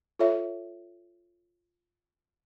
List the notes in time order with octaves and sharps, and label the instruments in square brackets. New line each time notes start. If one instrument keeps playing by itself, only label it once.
[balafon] F4 A4 C#5 E5